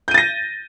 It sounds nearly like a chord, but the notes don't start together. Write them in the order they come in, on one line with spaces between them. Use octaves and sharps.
G6 D#7 A6 A#6